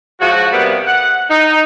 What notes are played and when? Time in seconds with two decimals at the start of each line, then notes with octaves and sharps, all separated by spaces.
0.20 F3 F#3 G#3 F#4
0.52 C3 G3 A#3 B3
0.86 F#5
1.30 D#4